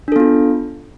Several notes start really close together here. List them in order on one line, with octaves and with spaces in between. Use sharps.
D4 A4 B3 F4